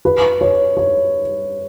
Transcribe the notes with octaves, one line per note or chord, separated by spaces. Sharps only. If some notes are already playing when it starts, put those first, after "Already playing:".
B4
C#5
C#5